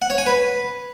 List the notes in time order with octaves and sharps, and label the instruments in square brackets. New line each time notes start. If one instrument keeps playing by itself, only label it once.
[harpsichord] F#5
C#5
G#5
B4